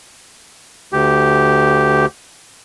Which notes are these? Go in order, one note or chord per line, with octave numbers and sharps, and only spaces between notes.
D2 G4